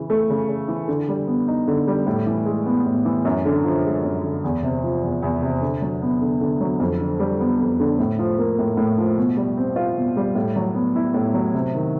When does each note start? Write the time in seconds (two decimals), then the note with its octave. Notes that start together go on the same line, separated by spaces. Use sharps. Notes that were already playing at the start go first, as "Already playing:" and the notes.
Already playing: C#3 E3
0.10 A3
0.29 C#3
0.48 C#3
0.68 E3
0.88 D3
1.08 G3
1.27 B3
1.48 D#4
1.67 D3
1.87 G3
2.06 A2
2.26 E3
2.46 G#3
2.66 B3
2.86 A2
3.05 E3
3.25 F#2
3.45 D3
3.64 F3
3.84 G#3
4.03 F#2
4.23 D3
4.44 E2
4.63 C3
4.84 F3
5.03 E2
5.23 E2
5.42 C3
5.62 D3
5.82 F#3
6.02 B3
6.22 D3
6.41 D3
6.61 F#3
6.80 F2
7.00 D3
7.19 G3
7.40 B3
7.60 F2
7.80 D3
7.99 A2
8.19 F3
8.38 A#3
8.58 A2
8.77 A2
8.98 F3
9.17 B2
9.37 G3
9.57 C4
9.76 F4
9.97 B2
10.17 G3
10.35 A2
10.56 F#3
10.75 B3
10.96 E4
11.14 A2
11.34 F#3
11.54 C3
11.74 D#3